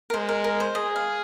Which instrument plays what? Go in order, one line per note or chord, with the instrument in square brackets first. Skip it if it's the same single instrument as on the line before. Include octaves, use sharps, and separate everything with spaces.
[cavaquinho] A#4
[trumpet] G#3 [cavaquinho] C5
[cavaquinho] A#4
A#4
C5
[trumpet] G#4 [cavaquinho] D#5
[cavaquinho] F5